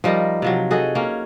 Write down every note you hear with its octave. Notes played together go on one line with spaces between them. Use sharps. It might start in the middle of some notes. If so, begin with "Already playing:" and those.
F3 G3 D#4 A#4
C3 F3 F#3
F#4 G#4 A4 D#5
A#3 C#4